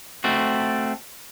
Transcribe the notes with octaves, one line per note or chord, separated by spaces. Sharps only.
A3 C4 F#4